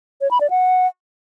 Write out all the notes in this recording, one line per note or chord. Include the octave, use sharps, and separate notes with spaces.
C#5
B5
D5
F#5